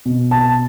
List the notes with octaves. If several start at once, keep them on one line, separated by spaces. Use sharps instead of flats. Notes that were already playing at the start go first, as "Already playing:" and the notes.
B2
A5